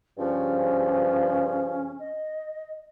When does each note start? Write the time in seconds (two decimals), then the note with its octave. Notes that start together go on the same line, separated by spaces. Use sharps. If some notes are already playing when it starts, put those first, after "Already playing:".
0.18 G2 C#3 F3 C#4
1.99 D#5